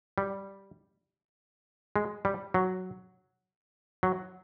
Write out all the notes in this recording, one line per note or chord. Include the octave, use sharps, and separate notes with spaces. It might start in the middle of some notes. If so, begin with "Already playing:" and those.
G3
G#3
G3
F#3
F#3